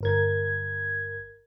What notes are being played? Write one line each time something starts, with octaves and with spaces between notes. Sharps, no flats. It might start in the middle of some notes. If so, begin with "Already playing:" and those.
G1 A#4 G#6